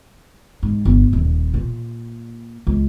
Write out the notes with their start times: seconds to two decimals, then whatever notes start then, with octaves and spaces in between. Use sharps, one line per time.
0.63 G#2
0.85 G1
1.13 D#1
1.54 A#2
2.67 C#2